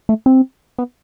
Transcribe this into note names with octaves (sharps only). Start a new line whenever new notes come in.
A3
C4
B3